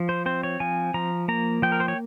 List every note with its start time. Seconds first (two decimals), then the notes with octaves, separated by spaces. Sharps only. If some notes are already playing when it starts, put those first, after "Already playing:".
Already playing: F3
0.09 C5
0.26 C4 C5
0.43 C#5
0.60 F3 G#5
0.94 F3 A#5
1.28 A#3 A#5
1.62 F3 G5
1.72 A#4
1.80 C5
1.88 C#5